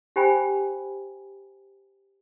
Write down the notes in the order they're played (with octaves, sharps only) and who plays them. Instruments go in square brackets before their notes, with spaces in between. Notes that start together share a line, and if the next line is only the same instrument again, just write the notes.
[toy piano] G4 C5 G5 G#5 B5